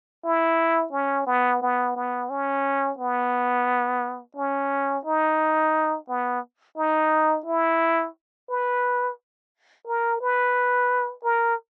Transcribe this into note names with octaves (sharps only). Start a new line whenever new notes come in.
E4
C#4
B3
B3
B3
C#4
B3
C#4
D#4
B3
D#4
E4
B4
A#4
B4
A#4